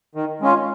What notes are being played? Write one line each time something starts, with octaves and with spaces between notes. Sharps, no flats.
D#3
G#3 C#4 F4